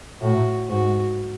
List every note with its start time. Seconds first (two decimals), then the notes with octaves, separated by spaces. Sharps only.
0.22 A2 F#4
0.69 G#2 F#4